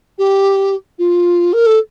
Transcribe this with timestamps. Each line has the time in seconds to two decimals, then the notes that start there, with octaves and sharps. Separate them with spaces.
0.18 G4
0.99 F4
1.53 A#4
1.66 A4